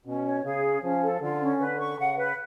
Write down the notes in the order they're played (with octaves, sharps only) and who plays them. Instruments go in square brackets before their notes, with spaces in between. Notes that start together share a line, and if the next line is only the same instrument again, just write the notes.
[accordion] B2 [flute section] C#4
[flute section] C#5
[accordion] C#3 [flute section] G#4
[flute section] C#4
[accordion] F3 [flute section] C#4
[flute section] A4
[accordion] D3 [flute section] F4
[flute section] C#4
[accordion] D3 [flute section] B4
[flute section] C#6
[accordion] C#3 [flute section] F#5
[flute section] B4